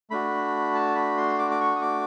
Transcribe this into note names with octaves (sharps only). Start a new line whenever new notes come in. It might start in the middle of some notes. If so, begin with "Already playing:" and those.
A3 D4 F#4 B5
A5
B5
C6
D6
D6
C#6
D#6
D6